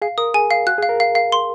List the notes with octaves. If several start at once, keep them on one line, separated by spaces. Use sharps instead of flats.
G#4 F5
A#4 D#6
G#4 G#5
F5
F#4 F#6
G#4
F5
A#4
F5
F5
C6